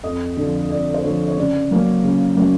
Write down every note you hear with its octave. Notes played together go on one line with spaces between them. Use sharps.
F2 D#5
D3 F3
F2 D5
C5
D3 F3 C#5
C#5
C#3 D5
F#3 A#3 C#4
C#3
F#3 A#3 C#4